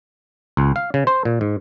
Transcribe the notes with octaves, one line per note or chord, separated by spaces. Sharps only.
C#2
F5
C#3
C5
A#2
G#2